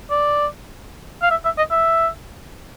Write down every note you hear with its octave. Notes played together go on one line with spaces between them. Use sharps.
D5
F5
E5
E5
D#5
E5